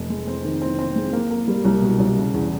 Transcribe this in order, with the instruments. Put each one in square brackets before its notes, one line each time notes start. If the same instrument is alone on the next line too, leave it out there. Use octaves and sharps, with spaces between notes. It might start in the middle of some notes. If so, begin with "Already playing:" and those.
Already playing: [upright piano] F1
G#3
C4
D#3
C4
C4
G#3
A#3
A#3
G3
C2
B2
C2
C#3
E2